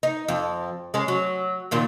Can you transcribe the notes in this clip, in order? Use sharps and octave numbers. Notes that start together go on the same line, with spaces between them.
D#4
F2
G#3 C#4
F#3
D#2 A#2 D#3